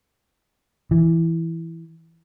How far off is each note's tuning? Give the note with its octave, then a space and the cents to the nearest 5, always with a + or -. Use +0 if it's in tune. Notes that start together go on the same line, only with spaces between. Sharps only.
E3 +0